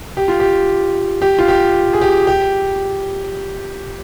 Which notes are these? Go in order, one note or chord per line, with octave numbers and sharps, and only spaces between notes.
G4
F4
G4
G4
F4
G4
G#4
G4
G4